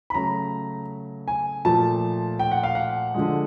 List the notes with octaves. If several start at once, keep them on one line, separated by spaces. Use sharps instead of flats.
B5
C#3 F#3 A3 A#5
G#5
A#2 F3 A3 A5
G5
F#5
F5
F#5
D3 F3 G#3